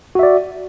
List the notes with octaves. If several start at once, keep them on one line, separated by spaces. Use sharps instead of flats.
F#4 D5 E5